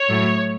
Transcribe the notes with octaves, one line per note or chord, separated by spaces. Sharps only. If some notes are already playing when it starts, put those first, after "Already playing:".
Already playing: C#5
A2 F#3 A3